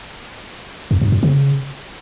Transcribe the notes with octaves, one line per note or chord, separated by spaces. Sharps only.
F2
G2
F#2
C#3